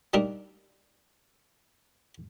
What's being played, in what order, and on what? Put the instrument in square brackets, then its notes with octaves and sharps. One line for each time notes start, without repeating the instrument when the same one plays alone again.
[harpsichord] G3 A#3 D4 D#4 A#4